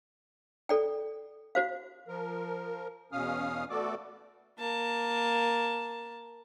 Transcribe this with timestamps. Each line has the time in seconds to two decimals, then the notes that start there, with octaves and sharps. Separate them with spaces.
0.69 A4 D5 G5
1.55 F#4 C5 F5
2.08 F3 A#4
3.12 E2 B2 C#4 F5 D#6 F6
3.70 A3 B3 F#4 A4 D5 D6
4.58 A#3 A5